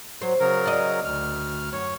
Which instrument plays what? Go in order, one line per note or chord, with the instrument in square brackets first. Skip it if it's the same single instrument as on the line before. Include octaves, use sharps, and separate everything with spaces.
[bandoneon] F#3 [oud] C5
[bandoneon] C#3 F#3 A#4
[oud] D5 D#5
[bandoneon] D2 F6
[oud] F#2 [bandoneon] C#5